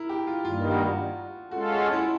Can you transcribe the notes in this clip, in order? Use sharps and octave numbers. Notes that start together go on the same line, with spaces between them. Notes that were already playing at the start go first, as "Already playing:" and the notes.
Already playing: E4 A#4
G4
F4
G2 D#3 G3 A#3 F4
F#4
G#3 C#4 F4 F#4 A4
F#4
E4